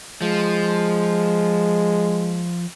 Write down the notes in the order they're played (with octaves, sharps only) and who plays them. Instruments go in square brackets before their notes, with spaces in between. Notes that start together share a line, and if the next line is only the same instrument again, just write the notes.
[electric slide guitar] F3 [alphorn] G#3